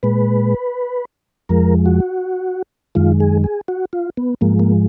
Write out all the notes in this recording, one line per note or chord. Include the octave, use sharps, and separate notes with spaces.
A#2 G#3 B4
F2 F3 G#3 A#4
F#4
F#2 D#3 G#3 F4
G#4
G#4
F#4
F4
B3
G#2 F3 G#3 A#3
A#3